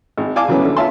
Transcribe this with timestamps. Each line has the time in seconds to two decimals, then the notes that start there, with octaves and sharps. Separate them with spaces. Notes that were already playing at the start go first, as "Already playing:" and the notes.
0.18 G#1
0.36 D5 F5 G#5 A5 D6
0.48 C#3 E3 F#3 A3 B3 C#4
0.61 E2 D3
0.77 F4 C#5 E5 A5 C6